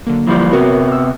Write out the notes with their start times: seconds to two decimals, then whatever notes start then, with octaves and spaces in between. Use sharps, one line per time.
0.07 D3 F#3 A#3
0.27 E3 F3 G3
0.53 C3 B3 F#4 A#4 C#5
0.88 E6 F6